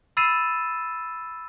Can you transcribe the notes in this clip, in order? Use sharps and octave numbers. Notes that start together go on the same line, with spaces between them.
B5 E6 A6 C7 D#7 E7